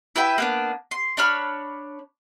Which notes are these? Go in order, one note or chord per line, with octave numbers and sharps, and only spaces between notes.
E4 B4 E5 G5
A#3 B3 D4
C6
D4 C#5 B5 F6